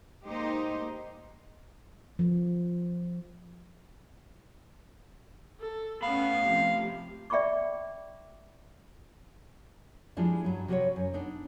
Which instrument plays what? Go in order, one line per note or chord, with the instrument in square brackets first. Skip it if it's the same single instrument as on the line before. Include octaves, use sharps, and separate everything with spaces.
[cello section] G#3 A#3 D#4 G4 C5 D#5
[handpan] F3
[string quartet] A4
[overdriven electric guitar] A3 B5 [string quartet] B3 C#4 [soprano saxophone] F5
[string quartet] C3 F3
[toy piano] D5 E5 G5 B5 C#6 D6
[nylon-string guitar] F3 G3 G#3 D4 E4 F4
G2 F#3
C3 F#3 F#4 A4 B4 C#5
F#2
B3 D4 D#4